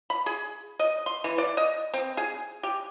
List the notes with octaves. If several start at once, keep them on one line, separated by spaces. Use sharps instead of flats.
B5
G#4
D#5
C6
E3
D5
D#5
C4
G#4
G4